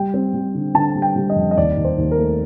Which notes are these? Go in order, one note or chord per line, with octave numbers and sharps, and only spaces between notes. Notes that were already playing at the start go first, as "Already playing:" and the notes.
Already playing: G3 G5
C4
G3
D3
D3 A5
G3
G5
G3
D#5
F2
D#5
D#2 D5
D#2
C5
D#2
A#4
A3